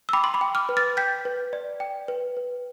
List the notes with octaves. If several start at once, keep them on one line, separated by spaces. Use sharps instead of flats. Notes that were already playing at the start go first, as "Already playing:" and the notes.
E6
G5 B5 D6
C6
B5 D6
G5
D6 F6
B4
F6 A6
G5 G6 B6
B4
D5
G5
B4
B4